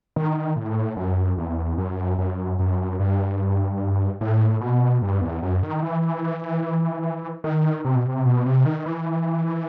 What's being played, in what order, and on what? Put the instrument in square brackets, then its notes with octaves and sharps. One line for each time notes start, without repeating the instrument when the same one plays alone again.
[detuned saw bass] D#3
A2
F#2
E2
F#2
F#2
F#2
G2
A2
B2
G2
E2
F#2
D#3
E3
D#3
C3
B2
C3
B2
C3
D#3
E3